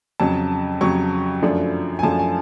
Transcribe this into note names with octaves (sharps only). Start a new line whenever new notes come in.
F2 C#3 F#3 A5
F2 C#3 F#3 C#6
F#2 F3 A3 D4
G#5
F#2 F3 A3 D4 A5
G#5